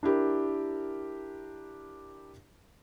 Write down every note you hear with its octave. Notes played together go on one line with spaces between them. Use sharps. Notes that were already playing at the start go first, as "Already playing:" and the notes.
D4 E4 G4 A#4